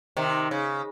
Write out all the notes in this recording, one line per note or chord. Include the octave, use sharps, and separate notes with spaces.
C3 D#3
C#3